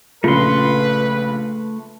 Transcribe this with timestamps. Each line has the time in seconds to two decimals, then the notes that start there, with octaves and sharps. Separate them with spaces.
0.24 A#1 C#3 A3 F4 B4 C6